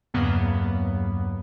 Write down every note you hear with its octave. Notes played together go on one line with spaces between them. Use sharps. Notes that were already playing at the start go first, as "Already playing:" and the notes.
E2 G2 C#3 F#3 A#3 B3